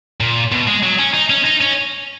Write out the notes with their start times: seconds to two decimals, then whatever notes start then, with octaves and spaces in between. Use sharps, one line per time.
0.20 A#2
0.52 B2
0.67 G#3
0.83 F#3
0.99 C#4
1.14 D#4
1.30 C#4
1.45 D#4
1.61 C#4